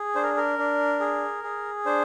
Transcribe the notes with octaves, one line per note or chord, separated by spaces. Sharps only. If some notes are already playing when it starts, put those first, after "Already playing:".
Already playing: G#4
D4 C5
A#4
A#4
D4
G#4
G#4
D4 C5